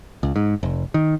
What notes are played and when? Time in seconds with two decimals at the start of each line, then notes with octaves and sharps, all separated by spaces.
0.23 C#2
0.36 G#2
0.63 F1
0.94 D#3